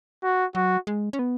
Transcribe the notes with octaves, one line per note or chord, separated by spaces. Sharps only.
F#4
F#3 F#4
G#3
C#4
B3